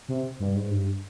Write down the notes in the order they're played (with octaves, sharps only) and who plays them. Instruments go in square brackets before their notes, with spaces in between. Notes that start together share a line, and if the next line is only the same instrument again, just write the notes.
[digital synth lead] C3
G2
G#2
G2